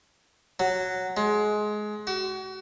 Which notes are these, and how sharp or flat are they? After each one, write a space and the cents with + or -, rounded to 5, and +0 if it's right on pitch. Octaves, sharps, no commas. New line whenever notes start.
F#3 +0
G#3 +20
F#4 +35